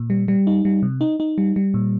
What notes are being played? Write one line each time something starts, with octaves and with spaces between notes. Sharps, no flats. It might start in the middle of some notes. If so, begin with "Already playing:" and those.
Already playing: A#2
G3
G3
D#4
G3
C3
D#4
D#4
G3
G3
A#2